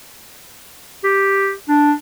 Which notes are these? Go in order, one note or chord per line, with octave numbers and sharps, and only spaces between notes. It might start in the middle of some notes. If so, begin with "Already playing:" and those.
G4
D4